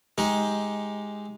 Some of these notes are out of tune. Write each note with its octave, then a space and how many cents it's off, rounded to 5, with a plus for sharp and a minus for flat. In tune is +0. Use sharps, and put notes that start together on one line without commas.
G#3 +0 D#4 +15 G4 +0